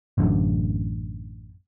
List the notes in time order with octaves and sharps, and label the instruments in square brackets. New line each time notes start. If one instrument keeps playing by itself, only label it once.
[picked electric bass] A1 F#2 D3